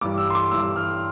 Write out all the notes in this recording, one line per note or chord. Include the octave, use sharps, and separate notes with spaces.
G2 E3 G3 D6
E6
C6
D6
G2 E3 G3 E6
F6